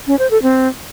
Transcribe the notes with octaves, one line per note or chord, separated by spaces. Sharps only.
C#4
C5
A4
C4